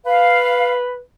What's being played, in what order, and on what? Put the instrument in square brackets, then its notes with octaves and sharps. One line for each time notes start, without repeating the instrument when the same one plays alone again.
[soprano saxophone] B4 [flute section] F5